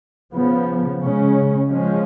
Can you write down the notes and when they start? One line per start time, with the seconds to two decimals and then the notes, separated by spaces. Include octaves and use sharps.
0.33 C#3 F3 B3
1.01 C#3 G#3 C#4
1.68 F3 G#3 C#4